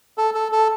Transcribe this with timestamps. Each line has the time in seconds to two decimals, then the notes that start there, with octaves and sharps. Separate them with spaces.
0.18 A4
0.34 A4
0.52 A4